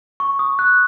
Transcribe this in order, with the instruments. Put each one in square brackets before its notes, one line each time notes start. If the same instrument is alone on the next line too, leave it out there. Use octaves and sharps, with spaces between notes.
[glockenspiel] C#6
D#6
F#6